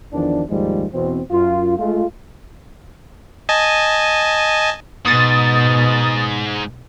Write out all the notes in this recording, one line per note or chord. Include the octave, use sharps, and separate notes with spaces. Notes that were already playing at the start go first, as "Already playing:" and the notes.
E2 D#3 F3 D4
D#2 G#2 F3 G3 G#3
E2 B2 E3 C4
F#2 F4
G#3 A3 F4
D#5 G#5 A5
G#2 B2 D#6 A6